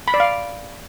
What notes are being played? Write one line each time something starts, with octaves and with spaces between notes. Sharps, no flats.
B5
D5
F5